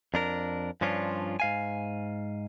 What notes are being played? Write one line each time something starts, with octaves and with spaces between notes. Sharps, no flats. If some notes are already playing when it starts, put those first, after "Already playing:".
F2 D4 A#4
G2 F3 C#4 D4 F4
G#2 F5 G#5